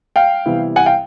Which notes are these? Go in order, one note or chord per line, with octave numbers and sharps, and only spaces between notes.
F5 G5
C3 E3 G3 B3 E4
F#5 G#5
F5 G5